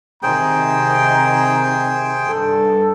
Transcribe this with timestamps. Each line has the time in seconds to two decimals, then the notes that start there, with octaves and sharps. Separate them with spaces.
0.23 C3 D#3 G#4 C5 G5 A#5
2.29 G2 A4